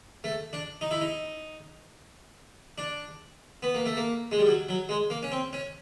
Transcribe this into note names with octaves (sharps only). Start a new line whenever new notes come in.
A3
D4
D#4
E4
D#4
D4
B3
A#3
A3
A#3
G#3
G3
F#3
F#3
G#3
A#3
C#4
C4
C#4